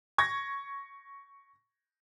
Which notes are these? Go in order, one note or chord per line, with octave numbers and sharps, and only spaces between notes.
C#6 G#6 A#6